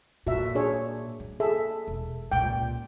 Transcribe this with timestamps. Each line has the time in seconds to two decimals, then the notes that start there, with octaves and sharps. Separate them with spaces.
0.27 A#2 F#4 E5
0.55 D4 G#4 C#5
1.20 A#3
1.40 G#4 A4 E5
1.87 E1
2.32 C#2 A#2 G5